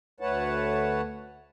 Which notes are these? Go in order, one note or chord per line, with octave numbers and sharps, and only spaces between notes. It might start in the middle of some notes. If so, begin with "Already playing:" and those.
D2 A3 B4 C#5 F#5 A5